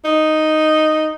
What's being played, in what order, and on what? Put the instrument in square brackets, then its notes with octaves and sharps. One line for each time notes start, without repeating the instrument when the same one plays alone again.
[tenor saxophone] D#4